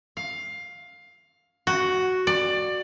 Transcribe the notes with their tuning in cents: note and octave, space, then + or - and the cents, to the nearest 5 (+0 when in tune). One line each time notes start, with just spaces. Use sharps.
F5 +15
F#4 +5
D5 +20